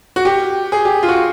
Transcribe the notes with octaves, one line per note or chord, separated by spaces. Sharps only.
F#4
G4
G#4
G4
F4
F#4